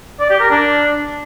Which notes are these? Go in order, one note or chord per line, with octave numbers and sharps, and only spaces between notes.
D5
G4
A#4
D4